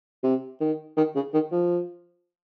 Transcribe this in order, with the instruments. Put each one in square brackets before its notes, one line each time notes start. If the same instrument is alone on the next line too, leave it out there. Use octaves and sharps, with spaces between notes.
[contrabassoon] C3
D#3
D#3
C#3
D#3
F3